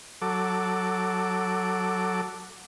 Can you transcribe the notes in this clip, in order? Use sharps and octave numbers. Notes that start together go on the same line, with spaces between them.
F#3 A4 D6